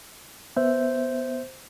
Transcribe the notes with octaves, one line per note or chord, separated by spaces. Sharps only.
B3 C5 E5